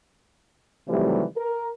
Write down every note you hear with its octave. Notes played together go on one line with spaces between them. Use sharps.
C3 D#3 E3 F#3 G3 A3
A#4